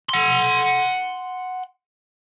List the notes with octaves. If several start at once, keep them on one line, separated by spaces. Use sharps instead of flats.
F#5 C6